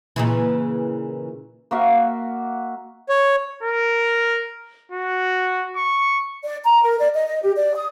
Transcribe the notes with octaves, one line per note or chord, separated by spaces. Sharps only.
A#2 C#3 E3
A#3 F#4 E5 F5
C#5
A#4
F#4
C#6
D5
A#5
A#4
D5
D#5
D#5
G4
D5
D#6